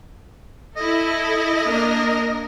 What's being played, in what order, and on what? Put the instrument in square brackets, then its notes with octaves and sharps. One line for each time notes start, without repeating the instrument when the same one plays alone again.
[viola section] E4 A4 [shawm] D#5
[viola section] A#3 D4 A#4